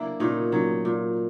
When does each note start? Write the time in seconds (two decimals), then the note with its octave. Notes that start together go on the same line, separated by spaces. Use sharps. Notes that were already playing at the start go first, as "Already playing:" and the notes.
Already playing: F#3 A#3 D4 E4
0.20 A#2 C#4 D#4
0.52 F#3 C#4 D#4
0.85 A#2